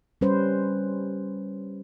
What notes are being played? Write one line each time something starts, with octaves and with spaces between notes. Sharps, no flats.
G3 C#4 B4 C5